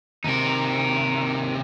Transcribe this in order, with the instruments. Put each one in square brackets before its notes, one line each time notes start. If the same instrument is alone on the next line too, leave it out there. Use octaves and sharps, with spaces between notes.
[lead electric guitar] D#2 C3 [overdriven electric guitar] D#4 A#4